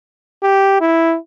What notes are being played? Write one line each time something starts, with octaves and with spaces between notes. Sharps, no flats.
G4
E4